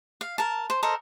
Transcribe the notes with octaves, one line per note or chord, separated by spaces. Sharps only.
F5
A#4 A5
C5
A4 A#4 C5 D#5